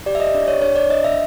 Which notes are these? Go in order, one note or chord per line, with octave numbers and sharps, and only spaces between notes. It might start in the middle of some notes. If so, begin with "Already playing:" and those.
G4 D5
E5
D#5
D4 D5
C#5
D4 C#5
D5
D4 D#5
E5